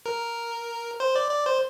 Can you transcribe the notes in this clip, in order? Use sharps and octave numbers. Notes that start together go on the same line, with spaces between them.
A#4
C5
D5
D5
C5